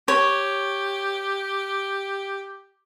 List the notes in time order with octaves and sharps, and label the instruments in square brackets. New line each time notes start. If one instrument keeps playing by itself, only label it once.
[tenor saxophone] G4 [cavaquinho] C#5